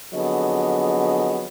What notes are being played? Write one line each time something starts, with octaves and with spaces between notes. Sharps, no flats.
F2 D3 F#3 B3 G#4 D#5